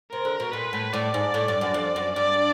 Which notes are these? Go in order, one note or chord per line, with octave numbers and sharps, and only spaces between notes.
C3 A#4
D3
B2
A#2 B4
A2
A2 D5
G#2
A2
G2
F#2
F2
F#2
G2 D5